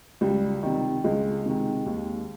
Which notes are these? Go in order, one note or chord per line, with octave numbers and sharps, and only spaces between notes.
C#2 G3
C3 D#3
C#2 G#3
C3 D#3
D#2